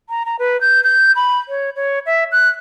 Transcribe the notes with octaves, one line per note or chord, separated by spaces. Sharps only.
A#5
A#5
B4
G6
G6
B5
C#5
C#5
E5
F#6